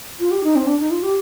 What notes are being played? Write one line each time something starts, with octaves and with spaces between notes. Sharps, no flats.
F4
G4
D#4
C4
D4
D#4
F4
G4